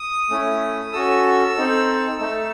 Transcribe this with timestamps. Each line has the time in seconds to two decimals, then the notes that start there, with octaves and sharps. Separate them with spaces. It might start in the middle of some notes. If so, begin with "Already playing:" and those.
Already playing: D#6
0.30 A3 C#4 E4
0.93 C#4 F#4 A4 E6
1.56 C4 D#4 A4
2.19 A3 D#4 A4 E6